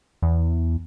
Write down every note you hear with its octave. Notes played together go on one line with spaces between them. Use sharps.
E2